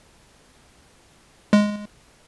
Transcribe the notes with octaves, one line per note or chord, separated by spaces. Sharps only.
G#3